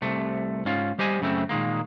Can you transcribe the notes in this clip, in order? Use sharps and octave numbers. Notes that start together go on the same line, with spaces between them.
C2 C3 A3
G#2 C#4 F4
G3 G4 C5 D#5 G#5
F#2 C#3 A3 C4
A#2 D#3 G#3 A#3